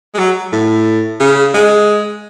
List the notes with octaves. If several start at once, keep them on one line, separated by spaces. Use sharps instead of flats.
G#3
F#3
A2
C#3
G#3